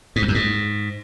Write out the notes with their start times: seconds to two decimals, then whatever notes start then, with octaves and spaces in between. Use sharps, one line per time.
0.16 G#2
0.22 E2
0.28 F#2
0.35 G#2